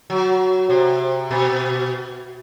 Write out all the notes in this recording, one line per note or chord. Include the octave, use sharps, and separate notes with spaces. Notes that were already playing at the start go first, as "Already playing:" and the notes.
F#3
C3
B2